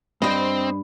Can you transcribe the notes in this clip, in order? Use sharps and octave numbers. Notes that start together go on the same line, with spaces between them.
G2 C4 C5 D5 D#5 B5